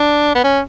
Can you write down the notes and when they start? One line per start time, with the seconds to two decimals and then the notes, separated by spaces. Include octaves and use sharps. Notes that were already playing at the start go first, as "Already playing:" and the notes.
Already playing: D4
0.35 B3
0.44 C#4